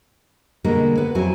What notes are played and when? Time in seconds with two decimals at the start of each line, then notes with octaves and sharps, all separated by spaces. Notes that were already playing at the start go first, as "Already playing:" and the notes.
0.64 B2 D3 G3 G#3 A#3 B3
0.97 B3 B4
1.15 F2 F#3 C4 E4 F#4 G#5